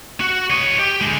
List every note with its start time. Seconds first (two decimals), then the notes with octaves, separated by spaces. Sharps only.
0.20 F#4
0.50 C#5 D#5
0.79 G4
1.01 D3 G#3